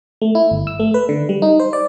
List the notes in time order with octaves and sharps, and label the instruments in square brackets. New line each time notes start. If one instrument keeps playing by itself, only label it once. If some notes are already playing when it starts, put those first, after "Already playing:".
[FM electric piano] A3
E4
G1
E6
A3
B4
D3
G3
D#4
C5
D5